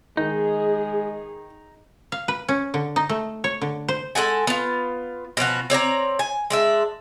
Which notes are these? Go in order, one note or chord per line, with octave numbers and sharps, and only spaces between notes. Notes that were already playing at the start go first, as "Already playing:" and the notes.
D#3 G#3 D#4 G#4
F5
B4
C#4
D3
D#4
A3
C#5
D3
C5
G#3 A4 F#5 G#5
B3 F4
B2 F3 C#4 F#4
C4 C#5 D5 A#5
G#5
G#3 D4 E5